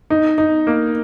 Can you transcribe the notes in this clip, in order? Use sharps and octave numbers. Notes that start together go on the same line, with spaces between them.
D#4
D#4
A#3